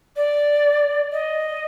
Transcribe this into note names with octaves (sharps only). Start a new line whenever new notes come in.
D5
D#5